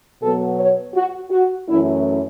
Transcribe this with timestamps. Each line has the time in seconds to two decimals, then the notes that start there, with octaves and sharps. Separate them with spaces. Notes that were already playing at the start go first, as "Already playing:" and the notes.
0.21 B2 F#3 B3 A4
0.58 C#5
0.95 F#4
1.31 F#4
1.68 F#2 E3 A3 C#4 E4